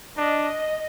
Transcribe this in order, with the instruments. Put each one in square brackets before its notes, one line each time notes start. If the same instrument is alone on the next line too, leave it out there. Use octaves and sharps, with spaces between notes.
[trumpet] D4 [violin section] D#5